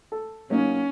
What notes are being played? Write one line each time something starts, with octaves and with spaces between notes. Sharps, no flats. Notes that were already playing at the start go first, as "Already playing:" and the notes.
A4
F#3 A#3 C#4 D#4